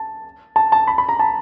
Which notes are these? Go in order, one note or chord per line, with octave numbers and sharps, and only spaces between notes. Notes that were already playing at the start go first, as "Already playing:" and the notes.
Already playing: A5
A5
A5
B5
B5
A#5
A5